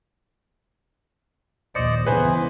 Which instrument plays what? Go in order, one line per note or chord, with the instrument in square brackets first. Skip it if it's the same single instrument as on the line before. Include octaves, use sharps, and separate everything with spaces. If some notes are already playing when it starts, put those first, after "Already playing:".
[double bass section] A#1 D#2 [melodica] C5 D5 D#5 [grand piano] C#7
[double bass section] C#3 E3 B3 [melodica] G#4 [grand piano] B4 C5